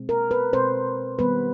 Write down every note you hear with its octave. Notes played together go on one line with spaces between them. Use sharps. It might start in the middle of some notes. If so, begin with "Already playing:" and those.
Already playing: B2 G#3 C4
A#4
B4
B2 G#3 C4 C5
D#3 G3 B3 B4